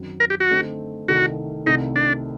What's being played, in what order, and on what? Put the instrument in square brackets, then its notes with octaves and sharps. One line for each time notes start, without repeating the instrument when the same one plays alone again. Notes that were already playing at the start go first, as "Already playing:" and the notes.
Already playing: [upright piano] F#2 D#3 F#3 C4
[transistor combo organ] A#4
G4
F#4
[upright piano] D3 A3 C4 D#4
[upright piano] C2 C3 D#3 A3 [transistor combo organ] F#4
[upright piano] C2 C3 D#3 A3 [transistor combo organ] D#4
[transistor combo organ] D4